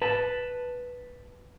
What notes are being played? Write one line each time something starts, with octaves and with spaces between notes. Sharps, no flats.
B4 A5